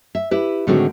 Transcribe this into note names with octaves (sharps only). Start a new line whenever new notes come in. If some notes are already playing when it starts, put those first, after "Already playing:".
E5
E4 G4 B4
A2 D3 D#3 G#3 C4 F#4